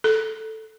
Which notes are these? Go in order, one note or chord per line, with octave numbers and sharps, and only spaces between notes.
A4